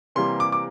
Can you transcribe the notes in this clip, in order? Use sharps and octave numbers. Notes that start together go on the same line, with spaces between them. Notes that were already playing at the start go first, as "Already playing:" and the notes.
C3 E3 G3 A#3 C6
D6
D6